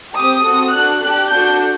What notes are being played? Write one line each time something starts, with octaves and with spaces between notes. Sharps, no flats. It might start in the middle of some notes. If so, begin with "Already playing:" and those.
C4 G4 D#6
C4 F#4 A4
D4 F#4 A4 F#6
D4 G4 F#6
D4 F#4 A4 G6